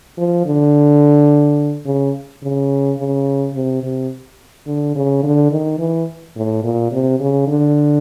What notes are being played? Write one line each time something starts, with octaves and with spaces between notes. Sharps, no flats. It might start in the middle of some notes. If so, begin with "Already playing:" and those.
F3
D3
C#3
C#3
C#3
C3
C3
D3
C#3
D3
D#3
E3
A2
A#2
C3
C#3
D3